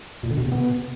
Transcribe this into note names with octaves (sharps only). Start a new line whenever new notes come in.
A#2
D3
B2
C3
B3